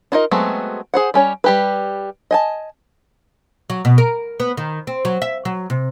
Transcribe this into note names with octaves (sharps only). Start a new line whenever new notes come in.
D4 D#4 F4 A#4 D#5
F#3 G#3 A3 B3 C4
G#4 C5 F#5
G3 C#4 C#5
G3 G4 B4
D#5 G#5 A5
F#3
B2
A#4
B3
D#3
C4
F#3
E5
F#3
C3